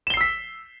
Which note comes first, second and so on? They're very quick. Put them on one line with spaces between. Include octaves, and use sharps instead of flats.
E7 G7 C7 E6 B6